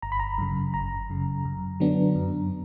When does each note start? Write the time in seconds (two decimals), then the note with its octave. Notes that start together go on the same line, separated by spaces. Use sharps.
0.02 G1 A#5
0.12 B5
0.20 A#5
0.38 F#2 C#3
0.74 G1 A#5
1.10 F#2 C#3
1.45 F#2
1.80 D3 F#3 B3 D4
2.15 F#2